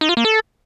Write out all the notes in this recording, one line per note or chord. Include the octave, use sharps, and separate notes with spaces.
D#4
F4
A#3
A4